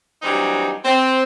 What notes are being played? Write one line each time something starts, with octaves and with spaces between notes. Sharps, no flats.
E3 F#3 G3 C4 D4 D#4
C4